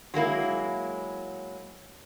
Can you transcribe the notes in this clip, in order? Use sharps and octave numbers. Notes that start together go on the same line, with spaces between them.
F#3 G#3 A#3 E4